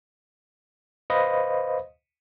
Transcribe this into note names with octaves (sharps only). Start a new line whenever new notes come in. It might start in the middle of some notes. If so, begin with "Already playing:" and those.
B4 C5 D#5 F5 B5